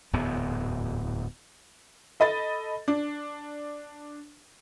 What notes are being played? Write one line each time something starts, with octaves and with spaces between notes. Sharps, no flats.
D1 E2 G#2 B3
A4 D#5 B5 A6
D4